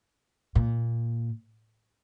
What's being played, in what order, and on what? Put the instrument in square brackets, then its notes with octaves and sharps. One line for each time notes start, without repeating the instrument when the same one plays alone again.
[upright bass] A#2